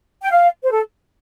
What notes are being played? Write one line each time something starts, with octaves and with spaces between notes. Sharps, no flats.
G5
F5
C5
A4